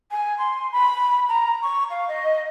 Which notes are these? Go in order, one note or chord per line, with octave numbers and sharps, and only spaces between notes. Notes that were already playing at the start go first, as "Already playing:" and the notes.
G#5
C6
B5
A#5
C#6
F5
D#5